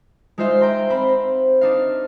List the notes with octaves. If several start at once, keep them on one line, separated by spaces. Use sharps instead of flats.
G#3 D#4 F4 C5 E5 F5
G5 A#5 C6
C4 C5 B5
D4 D#4 F5